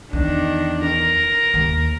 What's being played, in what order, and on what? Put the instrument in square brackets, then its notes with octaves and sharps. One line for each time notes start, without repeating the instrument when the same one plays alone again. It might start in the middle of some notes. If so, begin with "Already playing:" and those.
[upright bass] E2 [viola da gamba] D#3 D4
[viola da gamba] A#4
[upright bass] D#2